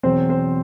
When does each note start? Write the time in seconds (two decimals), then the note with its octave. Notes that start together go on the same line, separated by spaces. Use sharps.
0.03 E2 B2 F#3 C4 C5
0.29 C4 C5